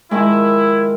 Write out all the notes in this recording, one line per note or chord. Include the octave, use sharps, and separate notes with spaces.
D#3 F3 G#3 E4